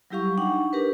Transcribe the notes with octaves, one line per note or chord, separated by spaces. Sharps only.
F#3 G3 E4 G4 F5 C#6
D4 D#4 F#5 G5 C#6
D4 G4 A#4 B4